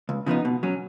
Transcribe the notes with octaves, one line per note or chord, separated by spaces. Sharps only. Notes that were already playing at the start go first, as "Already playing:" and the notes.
C#2
C#3 F3 B3 D#4
B2
F#3 C#4